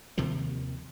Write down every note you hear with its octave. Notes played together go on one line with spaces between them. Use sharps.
D#2 C3 D#3 F3